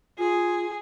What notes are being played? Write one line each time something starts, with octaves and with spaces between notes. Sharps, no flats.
F4 G#4